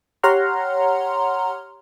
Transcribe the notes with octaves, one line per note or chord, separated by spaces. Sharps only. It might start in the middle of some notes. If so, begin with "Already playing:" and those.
G4 C#5 F#5 A#5 C6 F6